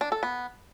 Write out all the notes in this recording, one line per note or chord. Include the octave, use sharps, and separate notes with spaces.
D4
A4
B3